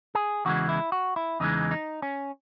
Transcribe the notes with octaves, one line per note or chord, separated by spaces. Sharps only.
G#4
E2 C#3 E3 G#3 F#4
E4
F#4
E4
E2 C#3 E3 G#3 D#4
D#4
C#4